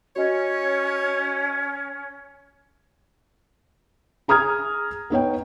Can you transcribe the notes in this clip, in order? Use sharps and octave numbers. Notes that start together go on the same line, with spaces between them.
C#4 F#4 C#5 D#5
G#4 A#5 D#6 F6 G#6
B3 D#4 C#5 G5